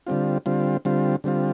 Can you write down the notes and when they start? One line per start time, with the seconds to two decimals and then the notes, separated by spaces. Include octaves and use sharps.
0.07 D3 G3 C4 F4
0.46 D3 G3 C4 F4
0.85 D3 G3 C4 F4
1.24 D3 G3 C4 F4